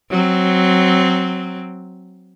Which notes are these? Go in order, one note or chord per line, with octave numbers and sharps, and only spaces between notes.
F#3 C4